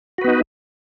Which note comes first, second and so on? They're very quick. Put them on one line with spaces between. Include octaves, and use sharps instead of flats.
F#4 B4 B3 D#4